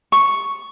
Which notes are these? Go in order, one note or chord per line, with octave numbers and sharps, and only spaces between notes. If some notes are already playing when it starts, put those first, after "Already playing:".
C#6